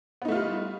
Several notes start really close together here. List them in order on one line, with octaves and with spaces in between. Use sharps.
B3 D#4 A3 F4 G3